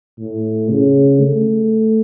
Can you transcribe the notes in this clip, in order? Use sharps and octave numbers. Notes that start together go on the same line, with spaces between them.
A2
C#3
A3